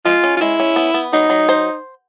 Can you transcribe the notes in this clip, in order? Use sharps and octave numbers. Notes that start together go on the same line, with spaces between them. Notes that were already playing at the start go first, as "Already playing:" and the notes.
G#3 F4
C#4
F4
G#3 E4
C#4
B3
B3
F#3 D#4
F#3
C5